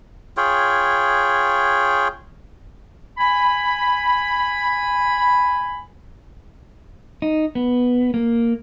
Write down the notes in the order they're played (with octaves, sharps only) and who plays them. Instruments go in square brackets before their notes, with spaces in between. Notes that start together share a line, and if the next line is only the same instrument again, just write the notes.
[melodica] F4 G#4 C#5 G5
[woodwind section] G#5 B5
[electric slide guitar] D#4
B3
A#3